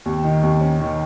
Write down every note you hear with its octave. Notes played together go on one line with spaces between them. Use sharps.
D#2
D#3
D#2
C#4
D#3